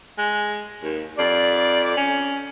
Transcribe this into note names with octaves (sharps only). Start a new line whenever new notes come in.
G#3
D#2
F2 D5
C#4